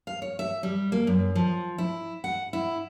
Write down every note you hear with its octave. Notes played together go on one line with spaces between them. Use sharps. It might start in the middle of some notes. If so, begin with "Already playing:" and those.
F5
C#5
E5
G3
A#3
F#2
F3
E4
F#5
E4